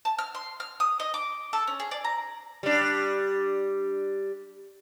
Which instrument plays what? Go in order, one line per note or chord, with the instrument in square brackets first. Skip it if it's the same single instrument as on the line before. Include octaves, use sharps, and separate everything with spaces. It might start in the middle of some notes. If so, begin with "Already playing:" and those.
[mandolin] A5
F6
C6
F6
D#6
D#5
D6
A4
C#4
G#4
D5
A#5
[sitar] G3 D4